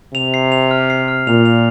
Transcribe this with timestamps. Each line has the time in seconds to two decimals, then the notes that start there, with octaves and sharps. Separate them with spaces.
0.15 C3 F7
0.34 C7
0.52 F7
0.71 F6
0.90 C7
1.08 F6
1.27 A#2 F7
1.45 F7